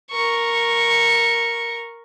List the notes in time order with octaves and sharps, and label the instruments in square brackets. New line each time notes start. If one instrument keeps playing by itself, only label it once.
[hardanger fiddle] A#4 C#6